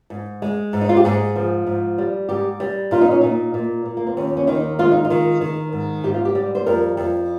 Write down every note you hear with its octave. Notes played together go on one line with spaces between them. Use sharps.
G#2
G#3
G#2
D#4
F4
G4
G#2 G#4
F3
G#2
G3
G#2 G4
G3
A#2 F4
D#4
C#4
A#2 D#4
A#2
A#2
A#3
C4
D#2 C#4
C#4
D#3 D#4
G#3 F4
D#4
F4
D#3
D#3
G#2
G#2 G4
F4
G4
G3
C5
F2 A#4
F2